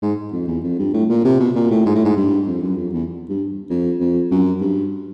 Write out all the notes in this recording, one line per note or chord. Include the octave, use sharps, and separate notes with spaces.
G#2
F2
E2
F2
G2
A2
A#2
C3
B2
A#2
A2
G#2
A2
G#2
G2
F2
F#2
F2
E2
G2
F2
F2
F#2
G2